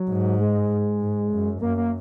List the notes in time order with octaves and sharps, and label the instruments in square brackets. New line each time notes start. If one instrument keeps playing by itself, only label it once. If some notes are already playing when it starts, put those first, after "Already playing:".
Already playing: [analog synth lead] F#3
[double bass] G#2
[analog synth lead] G#3
[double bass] G#2
F#2
[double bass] F#2 [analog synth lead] A#3
[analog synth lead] A#3